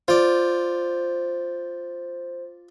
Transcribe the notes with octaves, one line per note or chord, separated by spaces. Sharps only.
F4 C5 D5